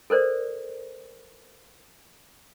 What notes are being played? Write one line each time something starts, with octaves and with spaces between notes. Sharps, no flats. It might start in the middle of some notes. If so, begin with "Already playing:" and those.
A4 A#4 C5 D5